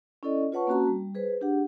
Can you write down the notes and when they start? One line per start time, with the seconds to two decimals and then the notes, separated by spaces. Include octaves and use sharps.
0.23 C#4 E4 A4 D5 D#5
0.52 F4 B4 C#5 F#5 A5 C#6
0.67 A#3 C4 C#4 F#4 A5 A#5
0.87 G3
1.15 G#4 B4 C5
1.41 D4 G4 G#4 F#5